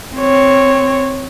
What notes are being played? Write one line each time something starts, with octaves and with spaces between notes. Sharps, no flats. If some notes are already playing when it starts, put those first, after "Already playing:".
C4 C#5